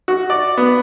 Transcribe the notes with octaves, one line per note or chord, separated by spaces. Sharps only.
F#4
D5
B3